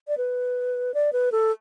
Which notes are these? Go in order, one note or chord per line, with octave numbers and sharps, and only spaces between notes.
D5
B4
D5
B4
A4